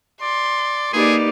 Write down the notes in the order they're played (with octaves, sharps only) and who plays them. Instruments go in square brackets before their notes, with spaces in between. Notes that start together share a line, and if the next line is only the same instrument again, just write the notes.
[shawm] D5 [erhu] C6
[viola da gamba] A#3 D#4 G4 [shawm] G#4 [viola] B4 D5